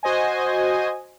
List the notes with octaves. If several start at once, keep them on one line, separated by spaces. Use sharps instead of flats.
F#4 C5 D#5 G#5